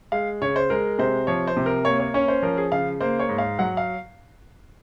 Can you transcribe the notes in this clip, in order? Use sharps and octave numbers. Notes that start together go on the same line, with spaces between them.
G#3 F5
C#3 C#5
C5
G#3 A#4
C3 C5
F3 C#5
C5
C3
A#4
A#3 C#5
C#5
C#4 C#5
C5
F3 A#4
G#4
C#3 F5
A#3 C5
C#5
G#2
F5
F#3 F#5
F5